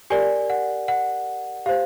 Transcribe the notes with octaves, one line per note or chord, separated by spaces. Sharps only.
G4 A#4 D5 G#5
F#5
F#5
G4 C5 F5